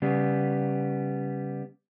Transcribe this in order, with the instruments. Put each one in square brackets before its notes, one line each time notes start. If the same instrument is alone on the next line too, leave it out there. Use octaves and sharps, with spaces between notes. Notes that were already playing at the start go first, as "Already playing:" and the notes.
[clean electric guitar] C#3 G3 B3